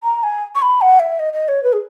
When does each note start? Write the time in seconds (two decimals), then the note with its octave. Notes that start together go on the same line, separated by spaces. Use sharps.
0.03 A#5
0.23 G#5
0.55 C#6
0.62 B5
0.81 F#5
0.99 E5
1.19 D#5
1.33 D#5
1.48 C#5
1.63 B4
1.73 G#4